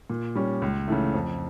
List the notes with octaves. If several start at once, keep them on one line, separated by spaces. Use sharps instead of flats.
A#2
G3 C#4
C#2
C#3 E3 A3
F2